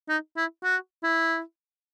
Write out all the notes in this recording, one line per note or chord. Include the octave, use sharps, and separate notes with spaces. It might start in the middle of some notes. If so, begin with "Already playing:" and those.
D#4
E4
F#4
E4